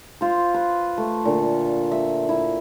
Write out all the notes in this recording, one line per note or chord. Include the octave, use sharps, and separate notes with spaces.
F4 C5
B4
A3
A#2 D3
E5
E4